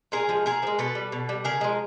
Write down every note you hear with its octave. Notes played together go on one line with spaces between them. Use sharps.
A#2 G#4 A#4
F3 G#3
A#2 G#4 A#4
F3
G#3
B2 A4 B4
G3
B2
G3
C#3 G#4 A#4
F3 G#3